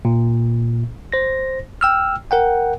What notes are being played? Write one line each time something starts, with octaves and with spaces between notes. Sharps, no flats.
A#2
C5 A#6
G5 E6 F6
A#4 F#5 G5